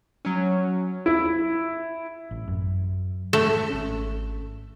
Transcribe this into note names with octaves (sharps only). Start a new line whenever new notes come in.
F#3 C#4
E4
A1
F#2
A3 E5
G#1 C#4